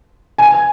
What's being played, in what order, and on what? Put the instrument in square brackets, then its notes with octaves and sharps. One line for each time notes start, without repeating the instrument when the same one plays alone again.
[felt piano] G#5